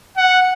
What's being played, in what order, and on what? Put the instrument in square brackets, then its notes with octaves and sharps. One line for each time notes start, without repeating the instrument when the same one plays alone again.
[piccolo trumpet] F#5